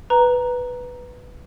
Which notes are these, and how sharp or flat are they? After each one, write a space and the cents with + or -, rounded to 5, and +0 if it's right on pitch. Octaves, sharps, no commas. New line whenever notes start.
B4 +0 A#5 +5